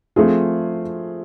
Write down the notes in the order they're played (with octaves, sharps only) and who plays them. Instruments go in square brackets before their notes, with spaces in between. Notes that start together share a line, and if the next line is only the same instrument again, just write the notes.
[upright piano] F3 A3 C4 F4 G#4